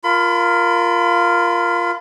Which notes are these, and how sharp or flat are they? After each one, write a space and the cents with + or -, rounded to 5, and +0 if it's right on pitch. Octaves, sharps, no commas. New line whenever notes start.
F4 +0 A#4 +0 B5 +35